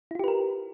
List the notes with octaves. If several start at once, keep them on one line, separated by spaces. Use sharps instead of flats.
E4 F4 G4 A#4 B4